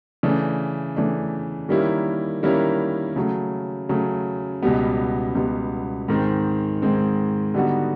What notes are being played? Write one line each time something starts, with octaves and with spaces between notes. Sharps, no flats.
C#3 E3 A3 D4
C#3 E3 A3 D4
D#3 G3 A#3 C#4 E4
D#3 G3 A#3 C#4 E4
C#3 F#3 A3
C#3 F#3 A3
C#2 B2 G3 B3
C#2 B2 G3 B3
G#2 D#3 G#3 C4
G#2 D#3 G#3 C4
D3 G3 B3 D#4 F#4